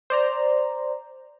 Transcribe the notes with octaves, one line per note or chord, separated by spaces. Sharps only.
C5 D5 A#5